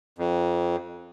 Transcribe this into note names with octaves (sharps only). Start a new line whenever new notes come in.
F2